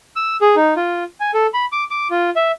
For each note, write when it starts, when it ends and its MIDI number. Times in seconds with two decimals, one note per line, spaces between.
0.16 0.37 88
0.41 0.55 68
0.56 0.74 63
0.76 1.04 65
1.20 1.31 80
1.34 1.47 69
1.54 1.65 83
1.72 1.84 86
1.90 2.08 86
2.10 2.30 65
2.36 2.52 76